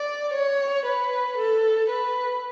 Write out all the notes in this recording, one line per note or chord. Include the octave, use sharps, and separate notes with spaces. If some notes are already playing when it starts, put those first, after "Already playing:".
Already playing: D5
C#5
B4
A4
B4